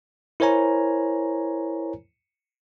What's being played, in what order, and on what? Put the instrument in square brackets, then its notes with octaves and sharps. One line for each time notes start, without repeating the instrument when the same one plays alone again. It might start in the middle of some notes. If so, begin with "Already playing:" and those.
[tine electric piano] E4 A#4 C5 C#5 G#5 A#5